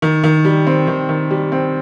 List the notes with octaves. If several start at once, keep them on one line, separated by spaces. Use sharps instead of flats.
D#3
D#3
G3
C4
D#3
D#3
G3
C4